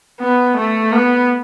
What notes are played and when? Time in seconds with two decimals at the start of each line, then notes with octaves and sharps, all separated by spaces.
0.21 B3
0.57 A3
0.93 B3